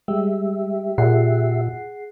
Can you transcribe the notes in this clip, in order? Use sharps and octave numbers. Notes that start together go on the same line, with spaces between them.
G3 G#3 G4 E5
A#2 G#4 F#5 C7